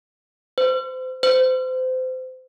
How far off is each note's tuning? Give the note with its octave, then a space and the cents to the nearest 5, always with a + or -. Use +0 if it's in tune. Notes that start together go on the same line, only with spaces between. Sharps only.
C5 -35
C5 -30